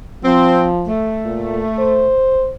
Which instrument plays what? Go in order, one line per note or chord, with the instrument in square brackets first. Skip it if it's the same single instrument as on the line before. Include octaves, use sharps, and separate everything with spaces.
[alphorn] F3 [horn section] C4
[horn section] A3
[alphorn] A#2
C5